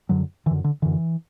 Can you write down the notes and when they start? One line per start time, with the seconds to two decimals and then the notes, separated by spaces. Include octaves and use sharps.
0.09 F#2 D3 F#3
0.46 D3 E3
0.51 F#2
0.64 D3
0.82 F#2 D3 E3